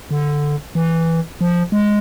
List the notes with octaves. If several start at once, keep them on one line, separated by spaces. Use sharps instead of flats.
D3
E3
F3
G#3